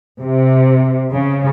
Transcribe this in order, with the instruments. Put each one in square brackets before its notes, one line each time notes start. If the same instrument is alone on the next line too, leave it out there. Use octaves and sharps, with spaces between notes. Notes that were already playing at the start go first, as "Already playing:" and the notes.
[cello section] C3
C#3